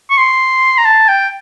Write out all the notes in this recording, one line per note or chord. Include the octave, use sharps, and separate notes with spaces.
C#6
C6
A#5
A5
G5